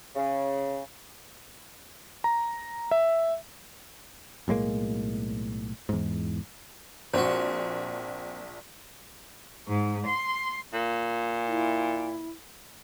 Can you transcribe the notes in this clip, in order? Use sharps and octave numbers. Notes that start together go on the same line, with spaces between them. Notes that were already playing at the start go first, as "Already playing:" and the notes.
C#3
A#5
E5
B1 A2 G#3 A#3
E2 G#2
A#1 C4 F#4
G#2
C6
A#2
E4